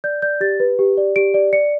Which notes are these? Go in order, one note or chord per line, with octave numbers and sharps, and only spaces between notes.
D5 G6
D5 G6
G4 A6
B4
G4
D5
G4 D7
D5
D5 C#7